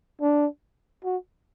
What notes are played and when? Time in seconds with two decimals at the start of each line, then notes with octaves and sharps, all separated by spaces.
0.21 D4
1.04 F#4